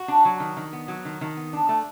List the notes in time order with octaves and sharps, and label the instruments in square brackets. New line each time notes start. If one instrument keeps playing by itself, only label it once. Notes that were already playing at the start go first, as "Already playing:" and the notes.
Already playing: [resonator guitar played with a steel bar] F#4
D4
F#3
D#3
D#3
B3
F#3
D#3
D#3
B3
D4
A3